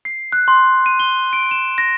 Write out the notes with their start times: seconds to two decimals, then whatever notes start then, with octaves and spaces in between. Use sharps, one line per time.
0.05 C7
0.32 F#6
0.48 C6
0.86 D#7
1.00 G7
1.33 D7
1.51 E7
1.78 A#6